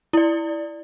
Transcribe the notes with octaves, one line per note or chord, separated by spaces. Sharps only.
E4 D5